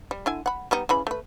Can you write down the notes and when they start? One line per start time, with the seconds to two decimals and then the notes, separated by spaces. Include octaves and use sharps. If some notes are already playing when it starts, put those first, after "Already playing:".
0.11 G3
0.26 D3 E4 G#5
0.46 F#5 B5
0.71 G3 B3 D#4
0.89 C#3 E3 B5
1.07 A3 B4